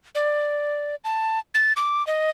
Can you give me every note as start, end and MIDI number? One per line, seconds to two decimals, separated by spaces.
0.15 0.95 74
1.04 1.39 81
1.54 1.73 93
1.76 2.05 86
2.07 2.30 75